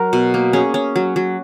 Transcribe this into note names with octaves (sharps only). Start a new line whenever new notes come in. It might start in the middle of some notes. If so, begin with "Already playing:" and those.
Already playing: F#3 A#4
B2
A#3
C#4 G#4
C#4
F#3
F#3